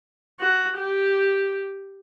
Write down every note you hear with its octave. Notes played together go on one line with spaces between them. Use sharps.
F#4
G4